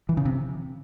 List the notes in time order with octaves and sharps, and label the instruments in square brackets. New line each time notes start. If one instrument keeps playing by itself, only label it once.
[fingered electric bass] E3
C#3
C3